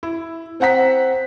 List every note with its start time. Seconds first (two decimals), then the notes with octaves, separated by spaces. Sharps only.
0.03 E4
0.60 C4 C5 F#5 A#5 B6